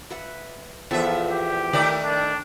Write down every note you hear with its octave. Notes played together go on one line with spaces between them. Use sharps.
B4 E5 F#5
E2 F3 B3 A4 E5
G4
D#3 A3 A#4 D5
D4